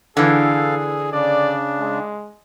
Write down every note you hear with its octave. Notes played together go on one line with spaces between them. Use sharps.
D3 E3 G#4 A4 F5
C#3 D4 D5
G#3